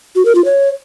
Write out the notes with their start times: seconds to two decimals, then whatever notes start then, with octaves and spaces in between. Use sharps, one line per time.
0.16 F#4
0.25 A#4
0.35 F4
0.45 C#5